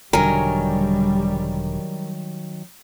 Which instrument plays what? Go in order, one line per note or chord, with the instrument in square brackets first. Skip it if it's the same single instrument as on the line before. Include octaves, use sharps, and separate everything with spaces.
[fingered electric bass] E1 D3 [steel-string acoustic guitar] D#3 F#3 [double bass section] G3 [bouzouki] A#4 G#5